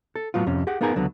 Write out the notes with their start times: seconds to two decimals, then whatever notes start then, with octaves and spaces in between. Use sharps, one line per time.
0.15 A4
0.34 A2 F#3 B3 F4
0.46 F2 C3 C#4
0.67 G4 G#4 F#5
0.81 A#3 B3 D#4 G#4 A#4 G#5
0.95 C#2 D3 F#3 B3